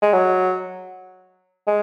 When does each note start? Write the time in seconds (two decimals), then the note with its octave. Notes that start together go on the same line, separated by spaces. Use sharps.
0.02 G#3
0.13 F#3
1.67 G#3